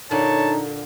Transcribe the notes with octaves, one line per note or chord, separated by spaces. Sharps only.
A#2 D3 D#4 C#5 A5